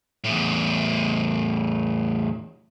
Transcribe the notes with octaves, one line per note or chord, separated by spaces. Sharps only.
E2 A2